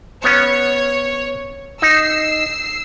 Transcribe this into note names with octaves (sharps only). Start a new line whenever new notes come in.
B3 C#4 C#5
D#4 E6 C7